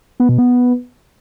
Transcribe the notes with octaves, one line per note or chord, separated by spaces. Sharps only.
B3
B2
B3